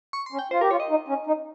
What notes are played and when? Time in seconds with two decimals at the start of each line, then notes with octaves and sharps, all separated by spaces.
0.13 C#6
0.26 C6
0.33 C#4
0.39 G5
0.51 F4 C5
0.61 G4 A#4
0.71 F4 C#5
0.80 D#5
0.90 D#4
1.08 C#4
1.27 D#4